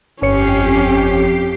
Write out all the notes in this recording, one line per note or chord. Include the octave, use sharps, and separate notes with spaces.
G1 F2 C#4 G4 C#5 C7 C#7